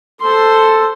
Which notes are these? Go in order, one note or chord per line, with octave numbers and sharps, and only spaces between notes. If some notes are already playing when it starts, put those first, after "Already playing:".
A4 C5 C6